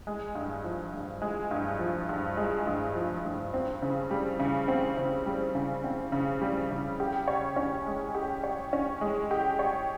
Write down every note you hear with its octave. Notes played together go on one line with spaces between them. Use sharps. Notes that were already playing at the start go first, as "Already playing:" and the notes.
G#3
G2
F3
G2
G#3
G2
F3
G2
G#3
G2
F3
G2
C4
C#3
G3
C#3
C4
C#3
G3
C#3
C4
C#3
G3
C#3
G4
C#5
C#4
G#3
G4
C#5
C#4
G#3
G4
C#5